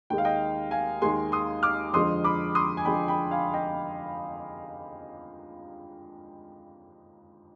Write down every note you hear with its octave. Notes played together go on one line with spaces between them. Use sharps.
D#2 D#3 G#3 G5
F5
D#5 G5
F5 G#5
D#2 D#3 G#3 G#5 C6
C6 D#6
D6 F6
F2 D3 F3 G#3 C6 D#6
B5 D6
C6 D#6
G#5
F2 D3 F3 G#3 G5 B5
G5 B5
F5 G#5
D#5 G5